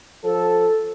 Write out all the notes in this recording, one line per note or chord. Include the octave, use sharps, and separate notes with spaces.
F3 A4